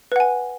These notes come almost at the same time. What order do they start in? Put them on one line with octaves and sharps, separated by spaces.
B4 F#5 G#5